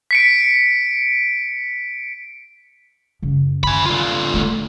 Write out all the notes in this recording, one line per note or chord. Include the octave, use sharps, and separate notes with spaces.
B6 C#7 D7
F#2 C#3
C#4 G#5 B5
D3 F4
A3 D#4